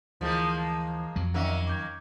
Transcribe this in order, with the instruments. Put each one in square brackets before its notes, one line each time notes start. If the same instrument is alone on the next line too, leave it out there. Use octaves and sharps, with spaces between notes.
[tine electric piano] D2 E3 G6 [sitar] F3 G#3 A#3
[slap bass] F2 F#3
[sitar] D#3 A#3 C#4 [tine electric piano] D5 E5 F#5
[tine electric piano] D6 G6 G#6